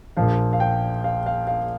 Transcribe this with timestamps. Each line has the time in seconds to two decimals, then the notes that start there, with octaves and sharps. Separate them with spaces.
0.17 A#1 A#2 F3 F5
0.53 F5
0.60 G5
1.04 F5
1.26 F5
1.47 F5